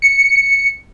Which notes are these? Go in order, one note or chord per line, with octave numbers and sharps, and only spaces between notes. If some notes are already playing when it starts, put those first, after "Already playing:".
C#7